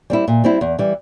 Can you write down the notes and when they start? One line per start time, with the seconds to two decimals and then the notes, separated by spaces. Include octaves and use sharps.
0.10 G3 C4 E4
0.28 A#2
0.44 G3 C4 E4
0.61 E2
0.79 E3 G3